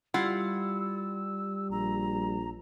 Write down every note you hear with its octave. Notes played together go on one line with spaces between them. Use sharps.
G3 E4 F4 F#5 E6
A#1 A#5